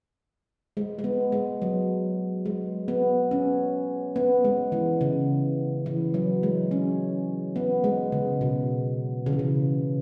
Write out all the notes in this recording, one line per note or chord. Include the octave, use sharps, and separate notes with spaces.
G#3
G#3
B3
G#3
F#3
G#3
B3
C#4
B3
G#3
E3
C#3
E3
F#3
G#3
C#4
B3
G#3
C#3
B2
C#3
E3
C#3